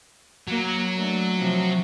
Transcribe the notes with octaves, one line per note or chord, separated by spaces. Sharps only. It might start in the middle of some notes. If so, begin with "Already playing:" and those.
F#3 A#3
A3 D4
C3 F3